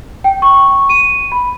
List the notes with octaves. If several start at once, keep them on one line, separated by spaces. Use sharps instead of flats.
G5
C#6
D#7
B5